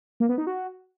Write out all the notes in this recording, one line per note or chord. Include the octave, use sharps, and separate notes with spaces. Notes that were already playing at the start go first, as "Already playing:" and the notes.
A#3
B3
D#4
F#4